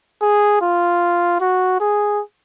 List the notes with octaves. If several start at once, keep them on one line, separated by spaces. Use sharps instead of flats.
G#4
F4
F#4
G#4